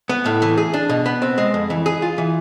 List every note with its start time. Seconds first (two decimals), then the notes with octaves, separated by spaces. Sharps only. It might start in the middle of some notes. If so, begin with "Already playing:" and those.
0.09 B3
0.26 A2
0.42 E3
0.58 G#4
0.73 D4
0.89 B2
1.06 B3
1.22 C4
1.38 G#3
1.54 F2
1.70 E3
1.86 G#4
2.02 F4
2.18 E3